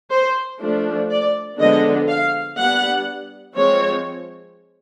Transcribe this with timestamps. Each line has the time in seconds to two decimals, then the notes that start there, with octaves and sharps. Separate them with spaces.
0.11 C5
0.61 F3 A3 D4
1.10 D5
1.59 D3 F3 G#3 B3 D4 D#5
2.08 F5
2.57 G3 B3 D4 F#5
3.56 F3 G#3 C4 C#5